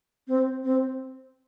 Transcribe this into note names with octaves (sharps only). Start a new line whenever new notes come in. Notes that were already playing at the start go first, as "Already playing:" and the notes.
C4
C4